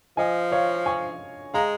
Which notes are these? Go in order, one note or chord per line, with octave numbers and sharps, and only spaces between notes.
F3 D#5 G#5
C#5 F5
G#5 C#6
G#3 F5 A#5